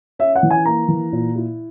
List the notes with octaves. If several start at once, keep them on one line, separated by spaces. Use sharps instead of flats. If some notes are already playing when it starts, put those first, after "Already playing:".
C#4 E5
F#5
E3
G#5
A#3 A#5
E3
A#2
E4